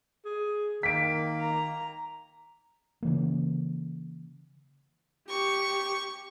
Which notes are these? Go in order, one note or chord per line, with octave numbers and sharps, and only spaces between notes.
G#4
D#3 A#3 B6 D7
A#5
C#3 E3 A#3
G4 C#6